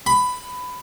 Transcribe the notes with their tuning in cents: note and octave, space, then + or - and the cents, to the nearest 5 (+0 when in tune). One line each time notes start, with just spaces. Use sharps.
B5 +15